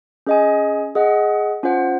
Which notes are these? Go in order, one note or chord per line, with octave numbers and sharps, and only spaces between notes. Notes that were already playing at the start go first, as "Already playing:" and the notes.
C#4 G#4 D#5 G#5
G#4 D#5 F#5
C#4 F4 C5 F#5